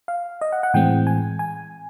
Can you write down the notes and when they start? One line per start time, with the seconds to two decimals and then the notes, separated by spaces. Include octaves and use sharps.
0.08 F5
0.41 D#5
0.52 F#5
0.63 F#5
0.74 A2 E3 G#3 C4 G5
1.07 G#5
1.39 G#5